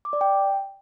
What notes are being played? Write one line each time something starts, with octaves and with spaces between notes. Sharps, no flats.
D6
D5
G5